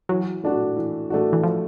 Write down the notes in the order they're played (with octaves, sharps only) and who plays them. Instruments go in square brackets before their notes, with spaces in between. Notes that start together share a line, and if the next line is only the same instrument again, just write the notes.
[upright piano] E3 [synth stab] F#3
[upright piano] A3 D4 F#4
E3
A3 D4 F#4
[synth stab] E3
F3